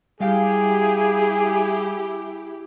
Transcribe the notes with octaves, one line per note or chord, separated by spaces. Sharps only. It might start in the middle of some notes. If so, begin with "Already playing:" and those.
G3 E4 G4 G#4 F5 G5